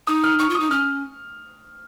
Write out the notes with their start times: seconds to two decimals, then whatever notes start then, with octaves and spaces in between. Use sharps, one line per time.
0.07 D#4 D#6
0.24 F6
0.39 D#4 C#6
0.49 F4
0.55 D#4 D#6
0.70 C#4 F6